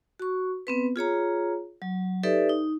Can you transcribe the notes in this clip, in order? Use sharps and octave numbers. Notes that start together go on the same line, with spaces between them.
F#4 C#6
B3 C4 B4
F4 G#4 C#5 A#5
F#3
D#4 G4 A4 B4 D5 E5
D#4